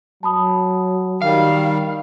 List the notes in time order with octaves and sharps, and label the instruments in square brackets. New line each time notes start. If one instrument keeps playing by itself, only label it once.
[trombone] F#3 [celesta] A5 B5 D#6
[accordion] D#3 G3 [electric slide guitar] F5